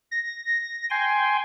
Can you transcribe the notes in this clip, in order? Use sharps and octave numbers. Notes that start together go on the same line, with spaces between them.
A#6
G5 G#5 C6